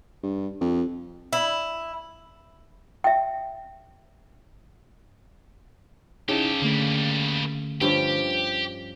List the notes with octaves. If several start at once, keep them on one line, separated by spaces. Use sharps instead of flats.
G2
F2
E4
E5 G5
C#3 D#4 E4 G4 A4
D3 G3 A3 A#3
G2 F3 C#4 G4